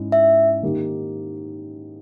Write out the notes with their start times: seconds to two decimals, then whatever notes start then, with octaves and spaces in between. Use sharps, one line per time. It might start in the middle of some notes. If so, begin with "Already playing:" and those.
Already playing: G#2 C#4 E4
0.12 E5
0.63 D#3 A#3 D#4 G4